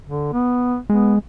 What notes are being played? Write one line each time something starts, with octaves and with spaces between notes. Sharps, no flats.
D3
B3
G#3 B3